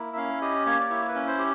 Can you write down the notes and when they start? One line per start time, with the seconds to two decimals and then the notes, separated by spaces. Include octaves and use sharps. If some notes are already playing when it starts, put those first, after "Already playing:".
Already playing: A#3 E4
0.13 E5
0.17 C#4 F5
0.41 G4 D#5
0.66 A#3 C#5
0.80 D5
0.90 E4 C#5
1.08 B4
1.15 C#4
1.27 C5
1.38 G4